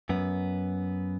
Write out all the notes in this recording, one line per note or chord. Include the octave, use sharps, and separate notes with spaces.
F#2 B3